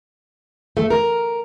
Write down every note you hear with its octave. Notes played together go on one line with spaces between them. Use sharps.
A3
A#4